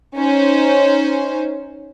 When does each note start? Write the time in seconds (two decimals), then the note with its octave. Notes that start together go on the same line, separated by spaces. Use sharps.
0.16 C#4 D#4 C5